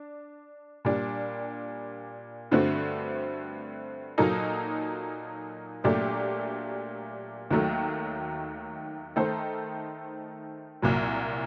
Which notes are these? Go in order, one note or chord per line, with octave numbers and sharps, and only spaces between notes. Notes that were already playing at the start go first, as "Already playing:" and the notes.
Already playing: D4
A#2 G3 D4
G2 D3 A3 C4 F#4
A#2 F#3 A#3 D#4 A4
A#2 F#3 A3 D4 G4
D#2 D#3 F#3 A3
D#3 A3 D#4 A4 C5
C2 A#2 F#3